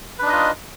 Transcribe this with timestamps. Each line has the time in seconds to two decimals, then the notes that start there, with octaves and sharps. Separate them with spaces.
0.19 B4
0.22 D4
0.26 D#4
0.29 D#5
0.33 F4